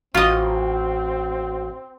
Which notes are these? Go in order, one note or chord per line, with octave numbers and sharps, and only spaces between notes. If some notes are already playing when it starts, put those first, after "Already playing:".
A1 C4 F4 F#4 D#5